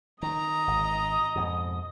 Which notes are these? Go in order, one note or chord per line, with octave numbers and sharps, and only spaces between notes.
D#3 D#5 A#5
G#1 D#6
F2 G#2 B2